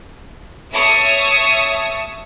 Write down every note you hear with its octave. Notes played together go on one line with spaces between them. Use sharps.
C#5 E5 A5 D#6